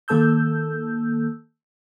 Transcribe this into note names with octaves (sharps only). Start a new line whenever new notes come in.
D#3 A#3 A4 A5 E6 G6